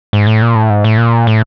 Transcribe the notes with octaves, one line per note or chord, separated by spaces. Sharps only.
G#2
A2
A#2
A2
G#2
A2
A#2
A2